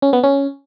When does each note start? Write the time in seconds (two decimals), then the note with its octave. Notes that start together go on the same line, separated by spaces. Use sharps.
0.02 C#4
0.13 B3
0.23 C#4